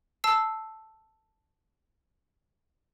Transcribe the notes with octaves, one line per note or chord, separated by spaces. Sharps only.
A5 E6 C7